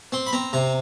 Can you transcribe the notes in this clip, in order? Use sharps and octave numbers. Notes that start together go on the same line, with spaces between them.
C4 C6
B5
C4 A#5
C3 A#5